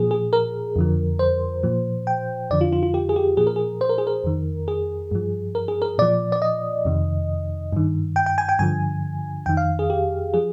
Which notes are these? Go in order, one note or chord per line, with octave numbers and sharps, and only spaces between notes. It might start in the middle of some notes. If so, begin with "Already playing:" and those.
Already playing: A#2 F3 G#4
G#4
A#4
F2 D3 F3
C5
A#2 F3
G5
F2 D3 F3 D5
F4
F4
F4
G4
G#4
G4
A#2 F3 G#4
A#4
G#4
C5
A#4
G#4
A#4
F2 D#3
G#4
G2 F3
A#4
G#4
A#4
A#2 F3 D5
D5
D#5
F2 C3 D#3
G2 D#3
G5
G5
G#5
G5
G2 D3 F3 G#5
F2 D#3 G5
F5
G#4
G4
F3 G#4